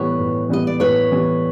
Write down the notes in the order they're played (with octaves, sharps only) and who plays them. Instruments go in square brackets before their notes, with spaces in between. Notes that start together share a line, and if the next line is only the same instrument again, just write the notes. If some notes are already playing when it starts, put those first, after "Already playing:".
Already playing: [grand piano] A2 E3 G3 B3 [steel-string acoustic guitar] B4 C#5
[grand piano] A2
[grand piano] E3 G3 B3 [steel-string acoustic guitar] D#5
[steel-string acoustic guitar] D5
[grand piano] A2 [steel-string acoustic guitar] B4 C#5
[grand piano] E3 G3 B3